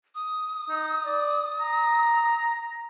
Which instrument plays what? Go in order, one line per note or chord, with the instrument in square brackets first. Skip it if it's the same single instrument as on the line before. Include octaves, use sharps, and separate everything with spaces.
[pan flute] D#6
[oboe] D#4
D5
A#5